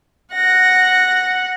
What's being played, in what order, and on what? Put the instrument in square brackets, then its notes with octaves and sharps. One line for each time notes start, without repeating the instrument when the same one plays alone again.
[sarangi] F#5 [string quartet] A#6